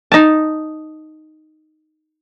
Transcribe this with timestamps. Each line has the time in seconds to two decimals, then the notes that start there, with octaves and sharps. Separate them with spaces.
0.12 D#4 A5